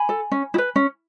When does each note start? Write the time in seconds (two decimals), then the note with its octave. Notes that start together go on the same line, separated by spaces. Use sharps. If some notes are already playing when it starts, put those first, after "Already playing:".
Already playing: G#5 B5
0.09 A4
0.32 C#4
0.54 E4
0.58 B4
0.76 C#4